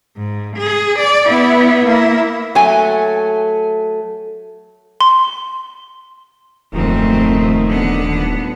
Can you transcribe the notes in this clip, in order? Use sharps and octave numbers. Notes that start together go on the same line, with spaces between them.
G#2
G#4
D5
B3 E4
A#3 E4
F#3 A3 G#5
C6
D#1 F#2 D#3 F3 A3 C4
D3 B3